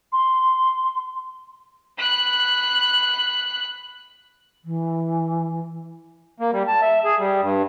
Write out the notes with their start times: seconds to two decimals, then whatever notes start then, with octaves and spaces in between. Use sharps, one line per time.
0.13 C6
1.98 B5 F#6
4.64 E3
6.40 A#3
6.52 G3
6.68 A5
6.82 E5
7.05 G#4
7.19 G3
7.42 G2